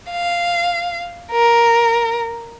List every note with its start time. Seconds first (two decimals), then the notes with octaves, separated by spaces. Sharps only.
0.11 F5
1.32 A#4